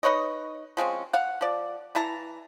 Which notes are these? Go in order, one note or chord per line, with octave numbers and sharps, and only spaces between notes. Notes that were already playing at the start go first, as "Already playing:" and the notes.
D#4 B4 C#5 D#5
F3 G#3 C4 C#4
F5 F#5
F3 D5
E3 E4 A5 A#5